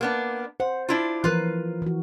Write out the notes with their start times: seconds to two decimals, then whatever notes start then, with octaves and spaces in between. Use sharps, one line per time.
0.01 A#3 B3 D4
0.60 C5 F#5
0.89 D4 E4 F4
1.24 E3 F3 F4 A#4 B4
1.82 E3 F#4